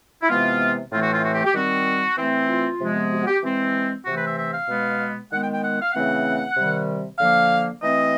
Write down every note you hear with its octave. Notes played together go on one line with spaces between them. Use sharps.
E4
C3 E3 G#3 B3 F4
A2 E3 A3 C4 F4
F#4
F4
F#4
G4
G4
D#3 G3 C4 F#4
E3 A3 C4
F4
C3 F3 G#3 B3
F#4
F#4
G4
E3 G#3 C4
C3 E3 A3 C4 F#4
B4
E5
E5
F5
B2 G#3 B3
D#3 G#3 B3 F#5
G5
G5
F#5
F5
C#3 E3 A3 C4 F#5
C3 D#3 G3
D3 F3 A#3 F5
E3 A3 C4 D#5